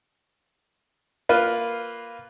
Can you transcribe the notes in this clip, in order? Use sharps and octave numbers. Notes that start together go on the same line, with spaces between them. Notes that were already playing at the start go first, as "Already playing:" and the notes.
A#3 F4 B4